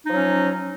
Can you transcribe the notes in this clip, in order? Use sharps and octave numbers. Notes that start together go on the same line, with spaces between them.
F3 F#3 C#4 D#4